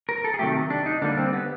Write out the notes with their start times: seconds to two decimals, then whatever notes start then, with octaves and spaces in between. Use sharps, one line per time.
0.09 A#4
0.24 A4
0.34 G#4
0.39 C3 D#3 F#3 A3 G4
0.70 D4
0.86 D#4
1.02 D3 G3 A#3 D4
1.17 C4
1.33 B3